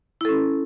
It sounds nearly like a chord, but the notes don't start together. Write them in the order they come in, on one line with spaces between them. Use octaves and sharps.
E4 A4 C#4